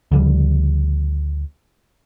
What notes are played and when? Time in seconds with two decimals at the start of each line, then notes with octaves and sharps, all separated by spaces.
0.12 D2 C#3 F3 G3